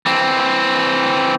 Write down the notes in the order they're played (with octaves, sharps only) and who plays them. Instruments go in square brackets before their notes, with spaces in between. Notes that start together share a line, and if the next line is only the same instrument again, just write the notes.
[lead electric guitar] E3 C4